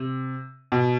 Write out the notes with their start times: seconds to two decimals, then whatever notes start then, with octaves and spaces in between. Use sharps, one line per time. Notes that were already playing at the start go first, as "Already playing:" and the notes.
Already playing: C3
0.72 B2